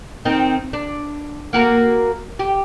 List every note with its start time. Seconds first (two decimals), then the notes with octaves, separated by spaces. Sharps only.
0.25 D#3 C4 D#4
0.73 D4
1.53 A#3 F#4 A#4
2.39 G4